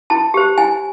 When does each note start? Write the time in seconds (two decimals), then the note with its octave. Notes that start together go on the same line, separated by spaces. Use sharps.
0.10 E4 A5
0.34 G4 C5
0.58 E4 G#5